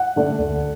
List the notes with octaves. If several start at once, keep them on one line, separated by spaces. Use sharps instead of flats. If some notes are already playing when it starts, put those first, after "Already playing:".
Already playing: F#5
D3 A3 D4
D2